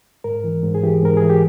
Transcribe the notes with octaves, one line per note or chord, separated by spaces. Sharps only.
G#2 A#4
E3
G#2
G#4
E3 G4
G#2 A#4
G#4
E3
G4